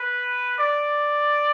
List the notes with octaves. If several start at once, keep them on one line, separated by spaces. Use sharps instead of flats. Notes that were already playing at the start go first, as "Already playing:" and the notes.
Already playing: B4
D5